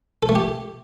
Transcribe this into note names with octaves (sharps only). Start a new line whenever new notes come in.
A4
A3
G4